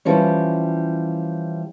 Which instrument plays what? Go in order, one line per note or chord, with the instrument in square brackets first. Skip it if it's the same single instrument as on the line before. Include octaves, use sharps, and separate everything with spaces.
[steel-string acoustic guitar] E3 F3 G3 C#4